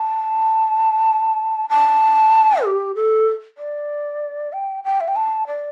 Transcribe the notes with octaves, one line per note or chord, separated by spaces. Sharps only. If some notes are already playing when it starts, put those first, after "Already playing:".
Already playing: A5
A5
G4
A4
D5
G5
G5
E5
G5
A5
D5